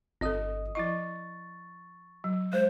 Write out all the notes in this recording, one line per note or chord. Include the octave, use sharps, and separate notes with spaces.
G1 C4 A4 D#5 D#6
F3 E4 D#5 C#6 A6
F#3
G#3 C5